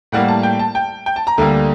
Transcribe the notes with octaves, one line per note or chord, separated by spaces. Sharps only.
A2 G3 A#3 F#5
A5
G5
A5
G5
G5
A5
A#5
D2 D3 G3 A#3